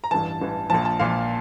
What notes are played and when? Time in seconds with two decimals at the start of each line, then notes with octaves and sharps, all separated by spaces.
0.04 A#5
0.11 A1 G2 E3 A5
0.41 A1 G2 E3
0.70 A#1 A#2 F3 A5
0.85 A5
1.00 A#1 A#2 F3 F5